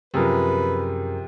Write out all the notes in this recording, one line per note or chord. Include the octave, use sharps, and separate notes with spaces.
F#2 C3 F3 G#4 A#4 B4